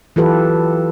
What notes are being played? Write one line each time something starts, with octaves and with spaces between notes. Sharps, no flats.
E3 F#3 F4 G4 A4 B4